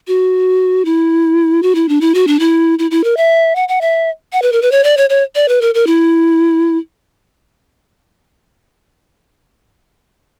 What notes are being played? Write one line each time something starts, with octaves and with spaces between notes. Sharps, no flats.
F#4
E4
F#4
E4
D4
E4
F#4
D4
E4
E4
E4
A#4
E5
F#5
F#5
E5
F#5
B4
A#4
B4
C#5
D5
C#5
C#5
D5
B4
A#4
A#4
E4